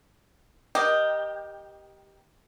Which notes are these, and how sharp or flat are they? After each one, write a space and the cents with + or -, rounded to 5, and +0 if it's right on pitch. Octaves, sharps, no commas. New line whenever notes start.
G4 +0 A#4 +30 D#5 -5